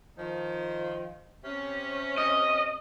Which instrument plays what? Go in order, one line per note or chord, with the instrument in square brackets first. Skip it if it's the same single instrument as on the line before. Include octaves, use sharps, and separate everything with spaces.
[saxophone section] D#3 F3
C3 C#4
[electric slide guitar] D#5